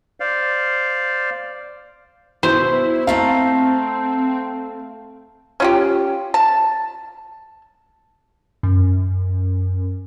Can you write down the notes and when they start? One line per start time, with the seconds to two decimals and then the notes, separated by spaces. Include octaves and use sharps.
0.20 C5 D5 F5
2.43 B2 E4 C5
3.07 A3 C4 A4 F5 A#5
5.60 C#4 F4 G4
6.34 A5
8.63 F#2